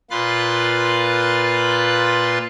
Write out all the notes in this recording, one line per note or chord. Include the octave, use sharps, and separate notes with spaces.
A#2 F4 B4 C6 F#6 A6